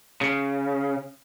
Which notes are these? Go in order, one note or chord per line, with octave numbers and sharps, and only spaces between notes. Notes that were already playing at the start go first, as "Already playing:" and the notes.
C#3